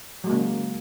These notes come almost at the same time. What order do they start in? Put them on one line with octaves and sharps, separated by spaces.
F#3 G#3 A#3 C#3